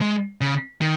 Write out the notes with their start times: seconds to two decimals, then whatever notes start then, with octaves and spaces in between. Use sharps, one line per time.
0.01 G#3
0.41 C#3
0.81 D#3